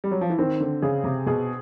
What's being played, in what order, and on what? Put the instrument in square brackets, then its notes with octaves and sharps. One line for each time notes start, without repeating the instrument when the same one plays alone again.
[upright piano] G3
F#3
F3
E3
[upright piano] D#3 [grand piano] C4
[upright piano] D3
[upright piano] C#3 [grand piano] G#4
[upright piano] C3
[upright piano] B2 [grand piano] G#4